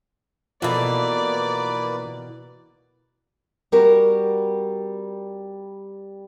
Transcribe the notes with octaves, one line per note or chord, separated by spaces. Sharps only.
B2 E3 F3 A#3 E4 A4 B4 D5
G3 C4 F#4 A#4